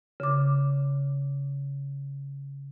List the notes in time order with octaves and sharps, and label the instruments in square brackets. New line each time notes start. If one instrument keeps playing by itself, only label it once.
[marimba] C#3 D6